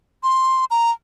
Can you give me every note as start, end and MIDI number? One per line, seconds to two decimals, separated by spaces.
0.23 0.65 84
0.71 0.91 82